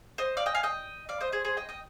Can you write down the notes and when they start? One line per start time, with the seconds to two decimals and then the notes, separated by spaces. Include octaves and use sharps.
0.18 C5 D#5
0.37 D5 F5
0.46 D#5 G5
0.54 F5 G#5
0.63 D#5 G5
1.09 D5 F5
1.21 C5 D#5
1.32 G#4 C5
1.45 G#4 C5
1.57 D#5 G5
1.69 D#5 G5